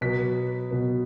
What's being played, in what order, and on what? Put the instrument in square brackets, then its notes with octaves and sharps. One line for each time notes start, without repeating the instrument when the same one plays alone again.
[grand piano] B2 F#3 B3 B6
B2 F#3 B3